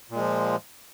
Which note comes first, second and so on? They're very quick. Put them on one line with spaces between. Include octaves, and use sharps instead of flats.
A#2 G#3 F3